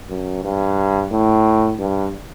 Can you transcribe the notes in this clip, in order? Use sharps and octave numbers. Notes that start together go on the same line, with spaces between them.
F#2
G2
A2
G2